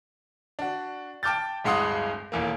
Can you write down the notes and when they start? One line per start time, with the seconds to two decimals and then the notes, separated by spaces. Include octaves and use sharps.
0.59 D4 F#4
1.23 G5 A5 D6 F6 G6 A6
1.64 D1 G2 G#3 F#5 C6 D#6
2.32 D#1 E2 A#3